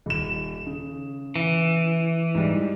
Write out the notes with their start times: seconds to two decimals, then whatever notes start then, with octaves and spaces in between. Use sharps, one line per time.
0.06 D#1 E7
0.66 C#3
1.36 E3
2.35 G#2 G3